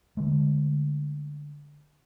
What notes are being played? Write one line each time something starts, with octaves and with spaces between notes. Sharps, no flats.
D3 G#3 A3